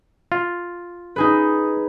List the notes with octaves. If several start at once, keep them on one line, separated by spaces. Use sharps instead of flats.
F4
D#4 G#4 B4